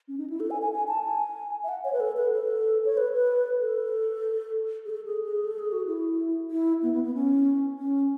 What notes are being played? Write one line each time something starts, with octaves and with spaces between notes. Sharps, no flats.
C#4
D#4
E4
A4
G#5
G#5
G#5
A5
G#5
E5
F#5
C#5
B4
A4
B4
A4
C#5
B4
B4
A4
G#4
A4
G#4
G#4
A4
G#4
F#4
E4
E4
B3
B3
B3
C#4
C#4